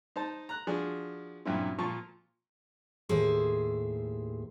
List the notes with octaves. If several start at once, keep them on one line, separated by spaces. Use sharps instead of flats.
D#4 C5 A5
A#5 F#6
F3 D4 F#4 G#4
G2 A#2 F#3 C4 C#4 E4
A#2 F3 F4 A5 C#6
D#2 A2 G#4 A4 C5